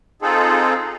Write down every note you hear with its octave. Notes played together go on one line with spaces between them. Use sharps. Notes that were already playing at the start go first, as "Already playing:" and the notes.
C4 D#4 F4 G#4 A4